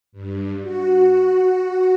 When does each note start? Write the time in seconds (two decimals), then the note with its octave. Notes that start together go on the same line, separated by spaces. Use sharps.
0.12 G2
0.61 F#4